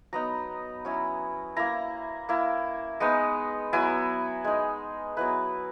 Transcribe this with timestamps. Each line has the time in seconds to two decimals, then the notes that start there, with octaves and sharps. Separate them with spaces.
0.13 F#3 B3 D#4 A#5
0.85 F#3 C#4 E4
1.56 A#3 E4 A#5
2.29 A#3 E4
3.00 G#3 B3 D#4
3.73 F#3 B3 E4 G#5
4.44 G#3 D#4
5.17 F#3 B3 E4 B4